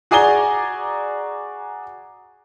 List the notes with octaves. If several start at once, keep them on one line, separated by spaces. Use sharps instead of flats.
F#4 G#4 D5 G#5 A#5 G7